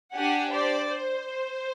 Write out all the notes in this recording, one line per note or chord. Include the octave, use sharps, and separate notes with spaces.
D4 G4 F#5 G#5
C5 D5
C5